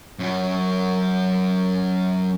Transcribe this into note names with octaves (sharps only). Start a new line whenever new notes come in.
F#2 F#3